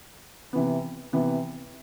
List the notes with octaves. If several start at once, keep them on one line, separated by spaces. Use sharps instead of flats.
C3 E3 B3
C3 E3 B3